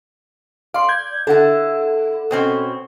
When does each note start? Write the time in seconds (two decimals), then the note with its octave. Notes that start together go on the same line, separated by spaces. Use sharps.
0.74 D5 F5 C6
0.89 G6 G#6
1.27 D3 E4 A4 F#5
2.31 B2 C4 C#4